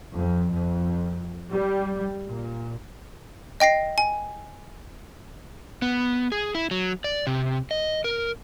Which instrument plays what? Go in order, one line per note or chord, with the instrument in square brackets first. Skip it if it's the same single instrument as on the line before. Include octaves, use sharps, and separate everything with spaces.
[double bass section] F2
F2
G3
A#2
[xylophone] D#5 G5 A#6 C7
G#5
[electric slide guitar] B3
G#4
E4
F#3
D5
C3
D#5
A#4